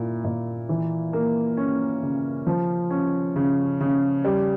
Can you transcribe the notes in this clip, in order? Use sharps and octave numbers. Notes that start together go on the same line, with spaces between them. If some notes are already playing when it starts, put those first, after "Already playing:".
Already playing: A#2 E4
A#2
E3
A#3
C#4
C#3
F3
C#4
C#3
C#3
G3